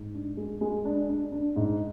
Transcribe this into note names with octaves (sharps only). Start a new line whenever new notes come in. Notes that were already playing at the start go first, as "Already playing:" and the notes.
Already playing: G#2
D4
G#3
G#3
D4
D4
D4
G#2